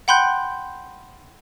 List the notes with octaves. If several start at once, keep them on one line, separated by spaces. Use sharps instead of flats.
F#5 G5 B5 C6 F#6 G6